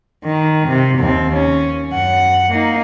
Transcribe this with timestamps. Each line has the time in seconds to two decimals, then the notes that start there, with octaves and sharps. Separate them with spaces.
0.25 D#3
0.68 C3
0.99 D#2 C4
1.34 C#4
1.91 F#2 F#5
2.51 A#3 D#4